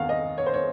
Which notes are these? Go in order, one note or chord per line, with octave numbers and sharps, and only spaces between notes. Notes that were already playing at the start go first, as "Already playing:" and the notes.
Already playing: E2 D#3 F5 F#5
D#5
C#5
C5
C#5